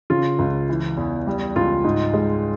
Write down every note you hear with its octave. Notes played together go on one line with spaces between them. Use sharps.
C#3 F4
C#2
E3
E2
G3
C#2 F4
G#2
G#3